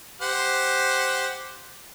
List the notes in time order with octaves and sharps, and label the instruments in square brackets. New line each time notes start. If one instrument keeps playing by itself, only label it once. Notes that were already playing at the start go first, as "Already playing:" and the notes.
[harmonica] G4 C5 F#5